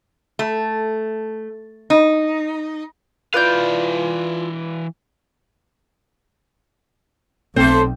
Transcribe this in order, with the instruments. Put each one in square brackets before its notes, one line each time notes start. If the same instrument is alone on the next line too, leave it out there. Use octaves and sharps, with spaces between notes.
[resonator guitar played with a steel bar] A3
D#4
[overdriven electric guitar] E3 F5 [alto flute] F4 [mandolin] B4 D5 G6
[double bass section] B1 [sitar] A3 A4 C5 [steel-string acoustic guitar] C4